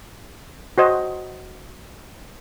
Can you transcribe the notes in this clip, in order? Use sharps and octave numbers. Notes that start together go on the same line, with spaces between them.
F#4 C5 D#5